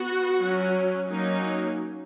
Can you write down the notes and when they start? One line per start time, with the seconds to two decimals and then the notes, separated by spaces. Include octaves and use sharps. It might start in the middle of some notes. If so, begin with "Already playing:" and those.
Already playing: B3 F#4
0.38 F#3 C#4
1.09 F#3 A#3 C#4 D#4